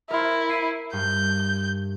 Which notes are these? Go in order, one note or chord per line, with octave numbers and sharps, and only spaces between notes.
E4 A#4 C6
E5 C7 D#7
G2 G6